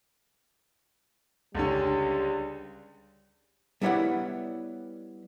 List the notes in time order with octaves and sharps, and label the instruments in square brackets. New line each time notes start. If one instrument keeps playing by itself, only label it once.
[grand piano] C#2 D3 C#4 [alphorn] G3
[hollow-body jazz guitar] G3 B3 E4 C#5 D5 F#5